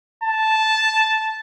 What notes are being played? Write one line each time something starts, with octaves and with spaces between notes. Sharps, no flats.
A5